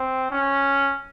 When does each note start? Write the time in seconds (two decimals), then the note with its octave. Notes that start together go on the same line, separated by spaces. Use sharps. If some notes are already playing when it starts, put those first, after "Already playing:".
Already playing: C4
0.31 C#4